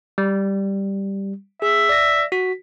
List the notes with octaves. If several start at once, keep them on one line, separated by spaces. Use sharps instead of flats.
G3
G#4 E5
D5 A#6
F#4 B6